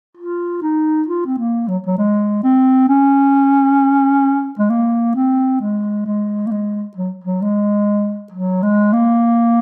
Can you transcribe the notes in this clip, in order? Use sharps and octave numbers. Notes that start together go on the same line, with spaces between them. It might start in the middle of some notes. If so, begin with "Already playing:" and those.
F4
D#4
F4
C4
A#3
F#3
F#3
G#3
C4
C#4
G#3
A#3
C4
G#3
G#3
A#3
G#3
F#3
F#3
G#3
F#3
G#3
A#3